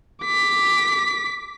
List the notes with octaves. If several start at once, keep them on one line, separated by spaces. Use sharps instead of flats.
D6 B6